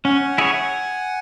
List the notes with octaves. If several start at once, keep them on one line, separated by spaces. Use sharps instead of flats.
C#4 F#5 G#5
E4 G#4 C#5